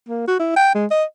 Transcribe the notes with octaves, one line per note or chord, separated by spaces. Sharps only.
A#3
F#4
E4
G5
G#3
D#5